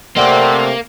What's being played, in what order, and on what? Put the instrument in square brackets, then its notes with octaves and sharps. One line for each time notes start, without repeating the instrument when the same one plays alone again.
[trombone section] C3 A3 [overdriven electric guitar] A#3 [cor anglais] C4 [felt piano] D5 F#5